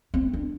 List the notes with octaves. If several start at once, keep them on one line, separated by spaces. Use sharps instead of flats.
C4
D4